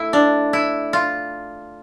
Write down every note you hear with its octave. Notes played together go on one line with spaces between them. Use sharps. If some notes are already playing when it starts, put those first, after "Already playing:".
Already playing: A3 E4
D4
E4
F4